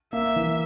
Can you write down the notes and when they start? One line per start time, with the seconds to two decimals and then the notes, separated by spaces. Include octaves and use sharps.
0.13 A#3 E5
0.36 E3